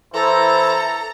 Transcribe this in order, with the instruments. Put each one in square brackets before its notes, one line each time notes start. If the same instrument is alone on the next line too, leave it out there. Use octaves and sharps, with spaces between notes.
[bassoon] E3 [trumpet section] E4 C5 [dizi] A4 [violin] A#5